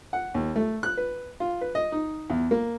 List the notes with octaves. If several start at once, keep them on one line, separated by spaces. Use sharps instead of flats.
F#5
D#2
A3
F#6
B4
F4
B4
D#5
D#4
E2
A#3